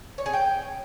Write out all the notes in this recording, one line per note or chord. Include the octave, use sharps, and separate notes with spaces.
C#5
G#4
G5